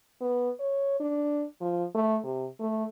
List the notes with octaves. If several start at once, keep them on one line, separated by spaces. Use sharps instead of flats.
B3
C#5
D4
F3
A3
C3
A3